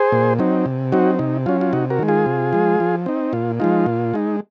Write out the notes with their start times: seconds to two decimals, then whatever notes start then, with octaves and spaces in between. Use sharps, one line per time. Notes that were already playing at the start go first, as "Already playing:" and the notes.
Already playing: G#4 C5
0.12 A#2
0.39 F#3 C4 D#4
0.66 C3
0.92 F#3 C4 D#4 F#4
1.19 C3 D#4
1.46 F#3 C#4 F4
1.61 F4
1.73 C3 D#4 F#4
1.90 F#4 A#4
1.99 D#3 G#3
2.08 F4 G#4
2.26 C3
2.53 F3 G#3
2.80 F3
3.06 C4 D#4
3.33 A#2 F4
3.60 F3 G#3 D#4 F4
3.86 A#2
4.14 G#3 D#4